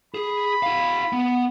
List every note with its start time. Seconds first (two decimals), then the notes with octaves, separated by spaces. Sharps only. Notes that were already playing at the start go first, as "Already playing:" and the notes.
0.14 G#4 B5
0.63 E4 F5
1.13 B3